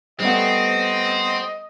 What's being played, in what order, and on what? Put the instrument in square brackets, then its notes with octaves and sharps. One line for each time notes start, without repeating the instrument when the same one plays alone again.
[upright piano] G3 A3 B3 [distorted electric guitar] C4 [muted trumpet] D#5